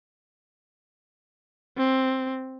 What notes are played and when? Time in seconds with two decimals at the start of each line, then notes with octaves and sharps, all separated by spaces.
1.77 C4